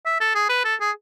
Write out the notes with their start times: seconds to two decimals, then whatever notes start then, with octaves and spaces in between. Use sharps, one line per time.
0.06 E5
0.20 A4
0.35 G#4
0.49 B4
0.65 A4
0.80 G#4